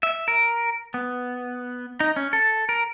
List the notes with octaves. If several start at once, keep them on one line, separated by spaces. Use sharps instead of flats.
E5
A#4
B3
D#4
C#4
A4
A#4